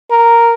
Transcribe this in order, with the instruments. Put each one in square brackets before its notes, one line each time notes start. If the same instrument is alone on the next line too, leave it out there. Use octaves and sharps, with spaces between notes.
[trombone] A#4